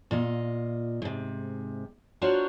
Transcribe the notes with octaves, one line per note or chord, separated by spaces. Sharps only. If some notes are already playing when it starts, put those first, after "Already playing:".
A#2 F4 D#5
G#2 C3
D4 F4 F#4 A#4 C5 C#5